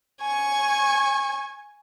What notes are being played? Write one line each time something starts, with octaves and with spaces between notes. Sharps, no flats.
G#5 C#6